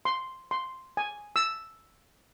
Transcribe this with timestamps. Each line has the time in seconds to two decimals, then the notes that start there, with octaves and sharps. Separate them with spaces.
0.05 C6
0.51 C6
0.97 G#5
1.36 E6